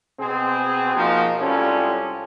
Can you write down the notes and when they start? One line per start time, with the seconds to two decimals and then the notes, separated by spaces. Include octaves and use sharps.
0.20 B2 C4 G#4
0.95 F3 A#3 D#4 F#4 A#4
1.39 C2 G3 G#3 C#4 F4 A4